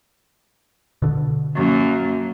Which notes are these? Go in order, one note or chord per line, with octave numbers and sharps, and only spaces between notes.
B2 D3
F#2 A#3